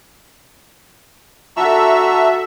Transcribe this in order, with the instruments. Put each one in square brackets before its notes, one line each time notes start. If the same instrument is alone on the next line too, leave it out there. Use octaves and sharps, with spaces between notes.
[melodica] D4 A#5 C#6 [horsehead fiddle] F#4 A4 [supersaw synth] E5